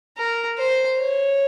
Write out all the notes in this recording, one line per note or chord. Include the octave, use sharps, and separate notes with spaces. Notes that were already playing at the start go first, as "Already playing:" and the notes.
A#4
C5
C#5